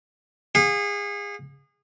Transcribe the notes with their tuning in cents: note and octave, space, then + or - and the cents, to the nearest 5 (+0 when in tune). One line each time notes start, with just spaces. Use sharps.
G#4 -30 F5 +40